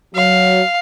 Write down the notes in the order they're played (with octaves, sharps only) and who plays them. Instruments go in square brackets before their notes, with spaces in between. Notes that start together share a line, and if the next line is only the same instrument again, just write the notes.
[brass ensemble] F#3 [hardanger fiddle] F5